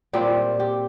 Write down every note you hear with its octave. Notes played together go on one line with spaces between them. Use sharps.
A#2 G3 C4 G4
G4